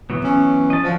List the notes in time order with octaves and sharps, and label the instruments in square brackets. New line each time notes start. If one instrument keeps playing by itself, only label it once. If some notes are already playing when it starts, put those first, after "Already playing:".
[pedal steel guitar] E3 F#3 B3
[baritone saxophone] C#4
[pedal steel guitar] D#5 A5
[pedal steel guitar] D3 D4 F#4 [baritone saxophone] F3